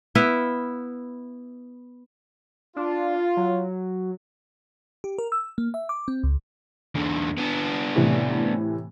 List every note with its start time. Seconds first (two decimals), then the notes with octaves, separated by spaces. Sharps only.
0.15 B3 E4 E5 F5
2.76 D4 F4
3.37 F#3
5.04 G4
5.19 A#4
5.32 E6
5.58 A#3
5.74 E5
5.89 D6
6.08 C4
6.24 C#2
6.95 E2 D3
7.38 B3 D4
7.96 A2 C3 E3